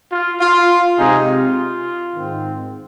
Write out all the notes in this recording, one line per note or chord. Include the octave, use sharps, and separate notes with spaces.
F4
F4
C3 G#3 C4 D#4 G#4
F4
G#2 D#3 C4